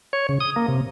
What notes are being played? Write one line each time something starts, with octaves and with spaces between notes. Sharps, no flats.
C#5
C#3
D#6
A#3
C3